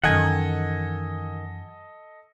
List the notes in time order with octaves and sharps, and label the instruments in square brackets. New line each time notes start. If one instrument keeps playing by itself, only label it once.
[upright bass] F#2 E3 [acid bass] D#3 [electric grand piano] A4 D#5 [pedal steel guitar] F#5 G#5